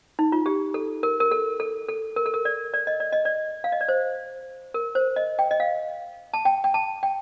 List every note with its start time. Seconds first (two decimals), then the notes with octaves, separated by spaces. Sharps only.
0.19 D#4
0.32 F4
0.46 G4
0.74 A4
1.03 A#4
1.20 A#4
1.31 A4
1.60 A4
1.89 A4
2.16 A#4
2.26 A4
2.34 A#4
2.45 D5
2.74 D5
2.87 D#5
3.00 D5
3.12 D#5
3.25 D5
3.64 F5
3.72 D#5
3.81 D5
3.88 C5
4.74 A#4
4.95 C5
5.16 D#5
5.39 G5
5.51 D#5
5.60 F5
6.34 A5
6.45 G5
6.64 G5
6.74 A5
7.03 G5